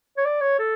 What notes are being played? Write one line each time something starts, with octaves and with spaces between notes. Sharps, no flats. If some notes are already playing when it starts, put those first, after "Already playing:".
C#5
D5
C#5
A4